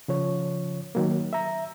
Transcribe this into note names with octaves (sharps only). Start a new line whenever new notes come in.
C#3 F3 C#5
D#3 F#3 A#3
E5 A#5